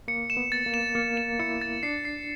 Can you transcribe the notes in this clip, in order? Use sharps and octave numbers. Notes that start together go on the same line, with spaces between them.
A#3 C#7
E7
B3
A6
A#3
E7
A#3 C#7
E7
E4 C#7
A6
D4 C7
C7